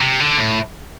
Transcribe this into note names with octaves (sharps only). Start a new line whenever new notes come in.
C3
D3
A2